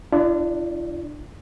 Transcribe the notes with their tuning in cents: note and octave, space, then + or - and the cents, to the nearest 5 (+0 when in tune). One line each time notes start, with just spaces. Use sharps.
D4 +25 F4 -40 D5 -30